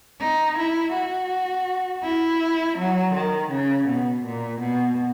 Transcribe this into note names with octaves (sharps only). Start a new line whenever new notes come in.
D#4
E4
F#4
E4
F#3
D#3
C#3
B2
A#2
B2